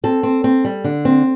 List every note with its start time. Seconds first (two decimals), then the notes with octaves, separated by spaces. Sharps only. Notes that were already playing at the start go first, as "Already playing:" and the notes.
0.04 C4 A4
0.23 C4
0.44 C4
0.65 G3
0.84 D3
1.05 C4